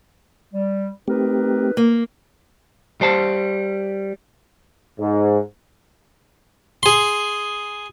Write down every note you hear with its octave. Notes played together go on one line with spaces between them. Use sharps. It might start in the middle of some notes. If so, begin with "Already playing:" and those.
G3
A3 C4 D#4 G4 A#4 B4
A#3
G3 C5 A5
G#2
G#4 C6